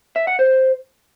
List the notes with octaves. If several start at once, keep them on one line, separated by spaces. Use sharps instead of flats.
E5
F#5
C5